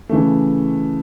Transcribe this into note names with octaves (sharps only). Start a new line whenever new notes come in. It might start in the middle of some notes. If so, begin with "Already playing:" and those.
C#3 E3 A3